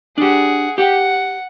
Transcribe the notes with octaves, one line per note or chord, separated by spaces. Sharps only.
D4 G4 G#4 F#5
G4 F#5 G5